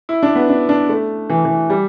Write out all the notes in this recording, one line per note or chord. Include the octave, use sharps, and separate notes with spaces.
E4
D4
B3
D4
D4
A3
E3
E3
G3